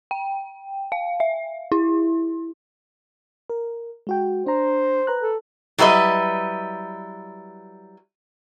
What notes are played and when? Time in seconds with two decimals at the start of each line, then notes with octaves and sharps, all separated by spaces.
0.11 G5
0.92 F5
1.20 E5
1.72 E4
3.50 A#4
4.07 G#3 F#4 G5
4.46 D4 C5 A#5
5.07 B4 A#5 F#6
5.21 A4
5.78 F#3 G3 E4 B4 D#5